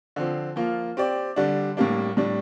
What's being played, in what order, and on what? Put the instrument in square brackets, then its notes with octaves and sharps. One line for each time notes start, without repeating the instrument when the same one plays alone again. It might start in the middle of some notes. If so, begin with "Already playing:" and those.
[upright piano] D3 F3 C4
F3 A#3 F4
C4 G4 D5
D3 G3 D4
A2 G3 A#3 D4
A2 G3 D4